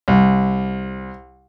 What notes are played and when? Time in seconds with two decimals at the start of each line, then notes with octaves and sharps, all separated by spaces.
0.08 C2